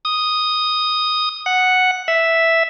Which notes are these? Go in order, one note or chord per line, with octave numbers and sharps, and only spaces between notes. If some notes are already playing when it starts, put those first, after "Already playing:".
D#6
F#5
E5